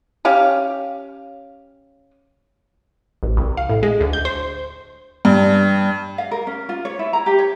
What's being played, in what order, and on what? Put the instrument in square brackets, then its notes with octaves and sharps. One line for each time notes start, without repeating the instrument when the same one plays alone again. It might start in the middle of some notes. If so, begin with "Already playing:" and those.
[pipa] C#4 G4 F5
[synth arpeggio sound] A1
C2
F5
A2
G#3
D2
G6
C5
[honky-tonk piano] G2
[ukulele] F5
A#4
C#4
F4
C#5
E4
A#5
G4
C#5